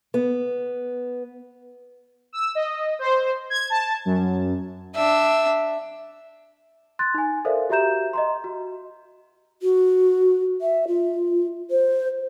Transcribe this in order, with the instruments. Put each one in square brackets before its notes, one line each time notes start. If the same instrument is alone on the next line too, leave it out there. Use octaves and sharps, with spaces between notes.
[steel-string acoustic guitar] B3
[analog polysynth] E6
D#5
C5
G#6
A5
F#2
[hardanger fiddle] D4 E5
[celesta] C6 F#6 A6
D#4 G#5
A4 A#4 C5 D5 E5 F5
F#4 G4 E5 A#5 G6 E7
D#5 A#5 C6
F#4
[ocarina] F#4
E5
F4
C5